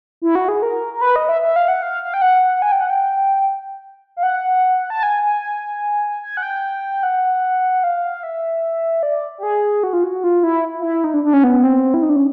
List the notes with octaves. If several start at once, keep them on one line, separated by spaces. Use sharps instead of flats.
E4
F#4
G#4
A#4
A#4
B4
D#5
E5
E5
F5
F#5
F5
F5
G5
F#5
G#5
G5
F#5
G5
F5
F#5
A5
G#5
G#5
G#5
F#5
G5
F#5
F5
E5
D5
G4
G#4
F#4
F4
F#4
F4
E4
F4
E4
D#4
D4
D4
C#4
B3
C4
E4
D#4
D4
C#4